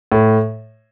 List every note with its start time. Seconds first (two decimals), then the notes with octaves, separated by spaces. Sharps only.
0.12 A2